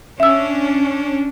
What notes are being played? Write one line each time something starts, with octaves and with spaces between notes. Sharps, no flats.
C#4 D4 E5 E6